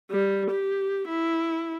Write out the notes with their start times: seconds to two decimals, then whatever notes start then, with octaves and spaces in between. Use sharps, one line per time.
0.10 G3
0.50 G4
1.07 E4